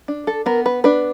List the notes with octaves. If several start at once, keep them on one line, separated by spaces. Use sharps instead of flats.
D4
A4
B3 A#4
B4
D4 B4